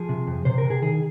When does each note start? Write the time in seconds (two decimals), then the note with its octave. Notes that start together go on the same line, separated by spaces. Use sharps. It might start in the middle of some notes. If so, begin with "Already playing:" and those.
Already playing: F3 G#4
0.09 C3
0.27 F2
0.45 C3 C5
0.58 A#4
0.65 C3
0.70 G#4
0.82 D#3 G#4